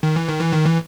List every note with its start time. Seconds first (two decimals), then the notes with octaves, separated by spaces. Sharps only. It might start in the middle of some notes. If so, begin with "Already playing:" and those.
0.03 D#3
0.16 E3
0.28 D#3
0.41 E3
0.53 D#3
0.66 E3